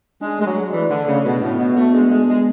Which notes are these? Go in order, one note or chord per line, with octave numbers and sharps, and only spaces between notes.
G#3 D4
G#3 A3
F#3
G#4
E3 D5
D3 D4
C#3 A3
B2 D4
A2 B3
B2 F#4
A3 B3
G#3 D4
G#3 B3
G#3 G#4